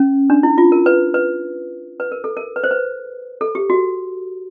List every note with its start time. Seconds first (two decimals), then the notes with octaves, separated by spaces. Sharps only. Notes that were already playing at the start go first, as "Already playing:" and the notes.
Already playing: C#4
0.30 D4
0.43 E4
0.58 F4
0.72 A#4
0.86 B4
1.14 B4
2.00 B4
2.12 A#4
2.24 A4
2.37 A#4
2.56 B4
2.64 C5
2.71 B4
3.41 A4
3.55 G4
3.70 F#4